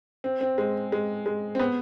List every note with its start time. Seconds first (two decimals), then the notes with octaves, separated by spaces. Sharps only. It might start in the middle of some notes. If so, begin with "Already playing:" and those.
0.24 C4
0.41 C4
0.58 G#3
0.92 G#3
1.26 G#3
1.55 C4
1.59 B3